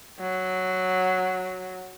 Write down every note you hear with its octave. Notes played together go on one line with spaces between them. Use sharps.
F#3